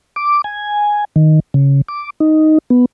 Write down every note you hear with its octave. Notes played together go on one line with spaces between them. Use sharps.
D6
G#5
D#3
C#3
D6
D#4
B3